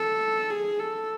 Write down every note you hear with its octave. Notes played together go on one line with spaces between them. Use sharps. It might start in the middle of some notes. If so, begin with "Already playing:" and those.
Already playing: A4
G#4
A4